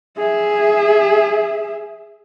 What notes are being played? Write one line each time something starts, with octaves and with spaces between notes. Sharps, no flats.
G#4 E5